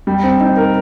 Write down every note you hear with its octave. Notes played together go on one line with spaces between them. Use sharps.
G3
C4
D#4
A#4